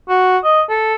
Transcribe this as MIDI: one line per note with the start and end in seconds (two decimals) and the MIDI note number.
0.09 0.38 66
0.44 0.62 75
0.70 0.95 69